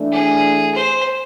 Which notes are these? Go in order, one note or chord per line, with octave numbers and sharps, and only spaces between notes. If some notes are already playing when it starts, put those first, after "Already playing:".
Already playing: E3 A3 D4
G#4
C5